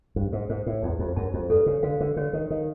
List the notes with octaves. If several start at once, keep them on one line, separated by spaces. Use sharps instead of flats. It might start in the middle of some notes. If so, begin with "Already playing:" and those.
G2 C5
G#2
G#2 C5
A2
E2 A5
F2
F#2 A5
F2
G2 A4
C#3
D3 F5
D3
D3 C#5
D#3
D#3 F5